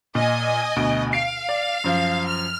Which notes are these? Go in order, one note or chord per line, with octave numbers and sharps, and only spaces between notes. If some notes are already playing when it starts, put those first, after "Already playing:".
A#2 D#5 G#5
D2 B2 D7
F5 C7 D7
D5
F#2 F3
F6